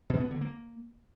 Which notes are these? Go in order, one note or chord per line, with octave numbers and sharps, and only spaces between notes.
B2
B3
D3
A#3